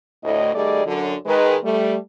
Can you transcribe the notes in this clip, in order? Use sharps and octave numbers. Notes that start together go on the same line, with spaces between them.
D2 A2 D#5
D#3 G3 A3 G#4 D5 D#5
F#2 D3 F#3
D#3 G#3 B4
G3 A3